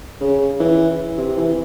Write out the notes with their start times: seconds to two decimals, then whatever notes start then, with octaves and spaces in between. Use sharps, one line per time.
0.21 C#3
0.60 E3
1.18 C3
1.37 E3